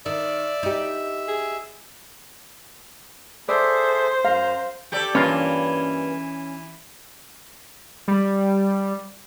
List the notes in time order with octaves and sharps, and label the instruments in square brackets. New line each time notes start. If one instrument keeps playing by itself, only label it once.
[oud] D#3 [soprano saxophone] D5 [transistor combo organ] E5
[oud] D#4 G4
[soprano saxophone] G#4
[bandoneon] G#4 A4 E5 [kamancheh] C5 [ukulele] D5
[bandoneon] F#2 A#5 [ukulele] F5
[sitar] G4 A4 D5
[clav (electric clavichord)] G2 A#3 F4 [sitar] E3 [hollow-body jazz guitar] C#4
[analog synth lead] G3